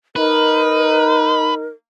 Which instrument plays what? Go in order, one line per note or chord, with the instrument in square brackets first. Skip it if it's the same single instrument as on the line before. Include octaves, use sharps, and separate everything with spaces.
[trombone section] D#4 [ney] A#4 [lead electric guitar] B4